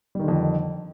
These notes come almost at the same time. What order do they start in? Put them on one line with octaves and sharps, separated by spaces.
G3 D#3 D3 F2